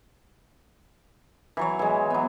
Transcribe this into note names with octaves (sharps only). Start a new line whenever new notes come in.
E3 F#3 C#5
E3 G#3
F#3 B3